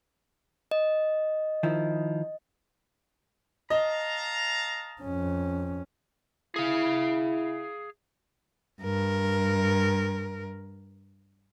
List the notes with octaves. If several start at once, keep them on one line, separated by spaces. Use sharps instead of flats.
D#5
D#3 F3 E4
D#5 F5 A5 A#5
F2 C#4
E4 G#4 F5
G2 A#4